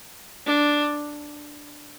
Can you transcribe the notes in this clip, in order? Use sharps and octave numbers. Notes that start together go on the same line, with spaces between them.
D4